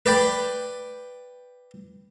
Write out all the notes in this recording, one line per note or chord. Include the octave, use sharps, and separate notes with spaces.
B4 D5 G5 B5